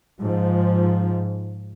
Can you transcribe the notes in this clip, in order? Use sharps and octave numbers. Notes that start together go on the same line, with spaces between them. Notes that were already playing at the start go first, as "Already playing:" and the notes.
G#2 F3